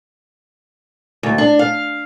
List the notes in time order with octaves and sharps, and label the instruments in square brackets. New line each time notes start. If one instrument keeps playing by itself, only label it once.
[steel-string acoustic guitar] D2
D4
F5